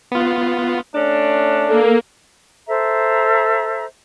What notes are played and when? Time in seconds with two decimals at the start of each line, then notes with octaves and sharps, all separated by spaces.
0.12 B3 F4
0.95 A3 C#4 D4
1.67 A#3 A4
2.68 A4 C5 E5 A#5